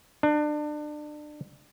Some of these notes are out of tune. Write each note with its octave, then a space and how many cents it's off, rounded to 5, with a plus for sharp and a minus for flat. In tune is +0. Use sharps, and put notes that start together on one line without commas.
D4 +30